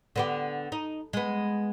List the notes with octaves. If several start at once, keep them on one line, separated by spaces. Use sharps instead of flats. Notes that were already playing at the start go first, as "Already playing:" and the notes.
D3 B3 G4
D#4
G#3 B3